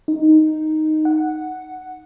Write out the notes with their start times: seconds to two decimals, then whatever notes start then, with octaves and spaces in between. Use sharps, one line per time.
0.08 D#4
1.05 F#5